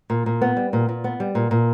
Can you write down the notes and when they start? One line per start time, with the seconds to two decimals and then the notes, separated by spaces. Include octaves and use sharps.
0.10 A#2
0.26 A#2
0.41 B3
0.57 G3
0.73 A#2
0.89 A#2
1.04 B3
1.20 G3
1.35 A#2
1.51 A#2